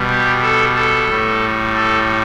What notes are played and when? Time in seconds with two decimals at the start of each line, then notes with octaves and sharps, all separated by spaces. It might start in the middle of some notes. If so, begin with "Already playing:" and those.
Already playing: B2 G3
0.09 G4
0.42 A4
0.75 A4
1.08 A2 G3
1.75 A4